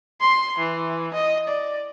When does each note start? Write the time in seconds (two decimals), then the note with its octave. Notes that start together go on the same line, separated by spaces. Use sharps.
0.21 C6
0.59 E3
1.14 D#5
1.48 D5